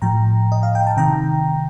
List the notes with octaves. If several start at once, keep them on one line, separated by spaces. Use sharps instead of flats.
A2 F3 G5 A#5
D#5
F5
G5
A5
C3 D#3 G5 A#5